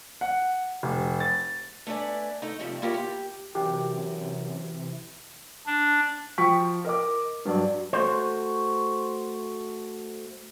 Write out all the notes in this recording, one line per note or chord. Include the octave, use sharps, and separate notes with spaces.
F#5
F1
A6
A3 D4 B4 D5 G#5
A3 D#4
C3 F3 G3 A3 C4
A#3 E4 F4 G4 A#4 C#5
G4
F#2 C3 E3 G4
D4
F3 G5 C#6 B6
A#4 D#5 D6
G2 F#3 D5
A3 F#4 C5